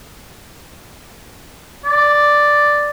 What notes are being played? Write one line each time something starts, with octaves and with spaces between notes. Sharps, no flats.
D5